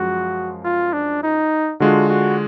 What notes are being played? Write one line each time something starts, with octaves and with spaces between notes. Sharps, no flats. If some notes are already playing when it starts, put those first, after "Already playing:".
Already playing: F#2 F3 G#3 F#4
F4
D4
D#4
D3 G#3 D4 F4 F#4
F#4